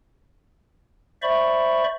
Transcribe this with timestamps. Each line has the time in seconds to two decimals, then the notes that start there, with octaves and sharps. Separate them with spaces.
1.22 C5 D5 E5 B5 C#6